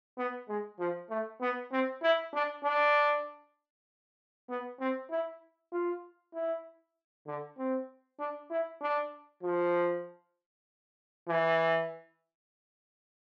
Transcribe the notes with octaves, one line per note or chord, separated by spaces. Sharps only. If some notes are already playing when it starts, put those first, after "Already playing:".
B3
G#3
F3
A3
B3
C4
E4
D4
D4
B3
C4
E4
F4
E4
D3
C4
D4
E4
D4
F3
E3